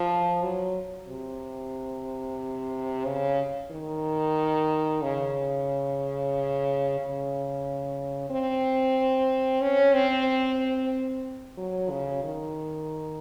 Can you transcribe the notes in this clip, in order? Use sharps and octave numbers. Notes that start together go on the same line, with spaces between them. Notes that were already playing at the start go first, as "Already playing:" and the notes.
Already playing: F3
F#3
C3
C#3
D#3
C#3
C#3
C4
C#4
C4
F#3
C#3
D#3